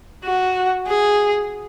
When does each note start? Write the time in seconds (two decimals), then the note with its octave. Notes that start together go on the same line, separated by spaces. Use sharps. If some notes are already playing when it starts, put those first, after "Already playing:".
0.24 F#4
0.87 G#4